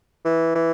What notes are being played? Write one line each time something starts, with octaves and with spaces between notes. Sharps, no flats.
E3
E3